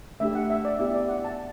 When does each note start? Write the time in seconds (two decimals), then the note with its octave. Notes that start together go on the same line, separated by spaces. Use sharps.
0.20 A3 D4 G4 E5
0.35 F#5
0.50 E5
0.65 D5
0.79 B3 E4 G4 E5
0.94 D5
1.09 F#5
1.24 A5